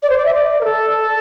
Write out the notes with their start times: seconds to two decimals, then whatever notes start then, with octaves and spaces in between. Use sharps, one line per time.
0.03 D5
0.10 C5
0.18 D5
0.25 E5
0.34 D5
0.61 A#4
0.65 A4